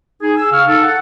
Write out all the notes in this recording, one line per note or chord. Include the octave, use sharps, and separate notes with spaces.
D#4 G#4
G#4 E6
C#3 F5 C#6 F6
D#4 A4
F#5